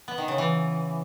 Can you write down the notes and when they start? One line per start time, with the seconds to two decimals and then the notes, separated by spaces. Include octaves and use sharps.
0.08 B3
0.18 D#3
0.28 C#3
0.38 E3